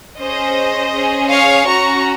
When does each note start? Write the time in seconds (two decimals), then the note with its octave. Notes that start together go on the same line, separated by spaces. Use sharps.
0.21 C#4 G#4 C5 D#5
0.95 C#4 G#4
1.32 C#5 F5
1.69 C#4 F#4 A#5 C#6